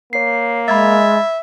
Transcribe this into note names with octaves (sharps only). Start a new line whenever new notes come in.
A#3 C#5 C7
G#3 E5 B5 G#6 A6